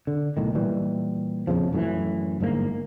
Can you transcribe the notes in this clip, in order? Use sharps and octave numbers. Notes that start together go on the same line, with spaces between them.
D3
B1 A2 D#3
A#2 E3 G3
A#1 F2 C#3 F3
F#2 A2 C#3 E3
G1 G#2 C#3 A#3